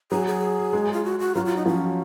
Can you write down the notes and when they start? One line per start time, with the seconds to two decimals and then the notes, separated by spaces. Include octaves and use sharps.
0.11 F#3 G#4
0.27 G#4
0.73 G#3
0.93 F4
1.05 F#4
1.20 F#4
1.35 F#3 F4
1.46 F4
1.56 D#4
1.66 F3 C#4